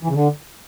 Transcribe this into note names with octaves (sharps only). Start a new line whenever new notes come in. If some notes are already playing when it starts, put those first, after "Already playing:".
E3
C#3
D3